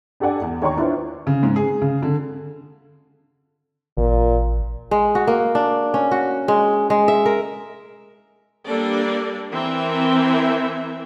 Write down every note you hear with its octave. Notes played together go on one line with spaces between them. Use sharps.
D4 G4 A4 D5 F#5 G#5
E2
D#2 C#5 G5 A#5 C6 C#6
D4 E4 F4 B4 C5
C#3
G#2
G#4
C#3
D3
A1 A#2
G#3
F#4
A#3
D4
C#4
F#4
G#3
G#3
E5
A#4
G3 A#3 D4 A4 D5
E3 C4 A#4 E5